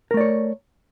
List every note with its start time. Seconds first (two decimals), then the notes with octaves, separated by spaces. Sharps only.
0.11 A#4
0.14 A3
0.17 D5
0.21 C#5